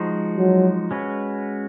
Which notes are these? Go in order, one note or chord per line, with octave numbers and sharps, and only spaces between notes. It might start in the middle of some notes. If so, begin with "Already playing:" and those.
Already playing: F3 G#3 D#4 F#4
F#3
G#3 C#4 F#4 B4